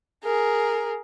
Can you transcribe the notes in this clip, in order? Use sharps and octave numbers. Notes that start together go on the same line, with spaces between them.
G#4 A#4